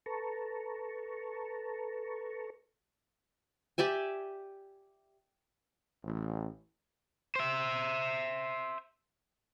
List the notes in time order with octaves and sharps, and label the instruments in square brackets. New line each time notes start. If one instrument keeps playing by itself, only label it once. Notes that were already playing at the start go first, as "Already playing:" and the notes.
[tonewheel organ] A4 B4 A5 A#5 C#6
[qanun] G4 D5 E5 G#5
[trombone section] A1
[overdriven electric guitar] C5 E5